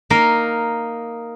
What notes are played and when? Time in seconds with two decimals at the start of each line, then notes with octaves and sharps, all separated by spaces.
0.10 A#3 D#4 A#4